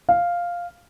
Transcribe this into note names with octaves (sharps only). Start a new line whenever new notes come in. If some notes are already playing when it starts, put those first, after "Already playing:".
F5